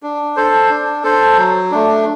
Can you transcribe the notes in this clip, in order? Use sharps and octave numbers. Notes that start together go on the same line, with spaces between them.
D4
A4 C5
D4
A4 C5
F#3
A3 D4